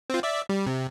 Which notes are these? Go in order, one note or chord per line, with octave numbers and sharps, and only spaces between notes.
C4 F4
D5 E5
G3
C3